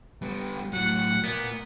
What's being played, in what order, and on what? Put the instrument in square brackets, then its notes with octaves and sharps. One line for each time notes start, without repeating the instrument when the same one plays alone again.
[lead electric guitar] G3 B3
[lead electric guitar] A2 F#3 [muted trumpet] F#5
[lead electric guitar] A#3 D5 [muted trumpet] B3